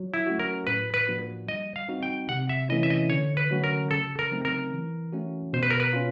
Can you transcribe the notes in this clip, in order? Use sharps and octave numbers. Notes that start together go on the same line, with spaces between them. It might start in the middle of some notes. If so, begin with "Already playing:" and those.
Already playing: F#3
E4
A3 C#4 F#4
A#4
A2 B4
B4
F3 A#3 D4 F#4
G3 D#5
F5
C4 D#4 F#4
G5
C3 F#5
E5
E3 A3 C#4 E4 D#5
E5
D#5
D3 C#5
B4
F#3 A3 C#4 F#4
A#4
C#3 A4
A#4
F#3 A3 C4 D#4
A#4
E3
A3 C#4 F#4
B2 C5
B4
A#4
B4
C#4 F4